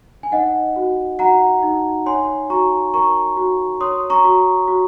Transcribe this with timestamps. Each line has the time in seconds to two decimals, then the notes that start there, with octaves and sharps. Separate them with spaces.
0.23 G#5
0.32 D#4 D#5 F#5
0.76 F#4
1.19 F#4 F#5 A#5
1.63 D#4
2.06 C#5 G#5 C6
2.50 F#4 A#5 C#6
2.94 A#4 A#5 C#6
3.37 F#4
3.80 C#5 C6 D#6
4.10 A#5 C#6
4.24 F#4
4.68 F#4